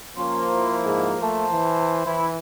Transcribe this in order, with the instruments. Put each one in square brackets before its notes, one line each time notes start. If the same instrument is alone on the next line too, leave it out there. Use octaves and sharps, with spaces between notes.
[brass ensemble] F3 A#3 [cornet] C#4 [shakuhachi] C6
[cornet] E4
[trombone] G#2 [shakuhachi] G#4
[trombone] A3 [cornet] C5 [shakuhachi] A5
[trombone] E3
[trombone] E3 [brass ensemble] E4